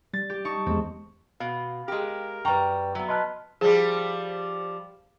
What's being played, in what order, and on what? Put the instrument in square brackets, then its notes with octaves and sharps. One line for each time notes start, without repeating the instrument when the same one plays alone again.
[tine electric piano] G3 [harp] A6
[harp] G4
D#4 A5 C#6
[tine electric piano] E2 G#3 [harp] C4
[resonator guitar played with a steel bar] B2 [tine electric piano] F5
[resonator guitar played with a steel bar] G#3 G4 [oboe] A#4
[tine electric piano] F#2 B4 [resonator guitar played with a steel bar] G3 A#5 [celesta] G5 C#6
[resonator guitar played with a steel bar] F#3 B3 [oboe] E5
[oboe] B4 [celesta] D#5 A5 F#6 [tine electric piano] C6 F6
[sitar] F3 G3 [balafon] G#4